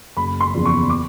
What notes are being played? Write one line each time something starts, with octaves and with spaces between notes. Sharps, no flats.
F#1 B5
C6
E2 C#3 F3
C#6
D6